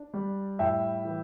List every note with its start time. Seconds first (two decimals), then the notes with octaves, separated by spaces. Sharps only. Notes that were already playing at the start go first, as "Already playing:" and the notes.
Already playing: D4
0.14 G3
0.59 A2 E5 G5
1.05 E3